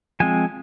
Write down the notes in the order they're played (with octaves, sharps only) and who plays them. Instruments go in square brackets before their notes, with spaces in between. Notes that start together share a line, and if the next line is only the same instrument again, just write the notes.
[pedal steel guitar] F3 G#3 C4 G#5